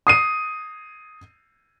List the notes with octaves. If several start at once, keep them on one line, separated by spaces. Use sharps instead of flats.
D#6 C7 D#7